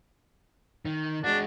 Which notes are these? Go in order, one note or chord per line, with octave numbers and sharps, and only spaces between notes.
D#3
G#3 D4 F#4